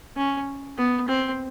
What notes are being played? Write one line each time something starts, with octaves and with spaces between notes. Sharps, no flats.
C#4
B3
C4